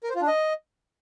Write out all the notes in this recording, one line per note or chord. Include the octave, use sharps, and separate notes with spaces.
A#4
C5
F4
D4
D#5